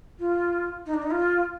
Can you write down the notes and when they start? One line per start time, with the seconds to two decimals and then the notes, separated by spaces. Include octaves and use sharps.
0.19 F4
0.86 D#4
0.94 D4
1.02 D#4
1.11 F4